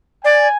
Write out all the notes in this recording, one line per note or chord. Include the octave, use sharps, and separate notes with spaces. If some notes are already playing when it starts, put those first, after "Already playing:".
D5 G#5